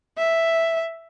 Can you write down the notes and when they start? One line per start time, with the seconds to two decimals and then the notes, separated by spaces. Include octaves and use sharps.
0.18 E5